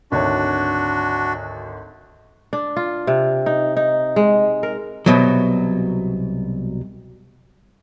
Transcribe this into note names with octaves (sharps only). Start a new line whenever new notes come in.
G#1 D2 D4 F#4 C#5
D4
F4
C3
D#4
D#4
G#3
A#4
C2 B2 F#3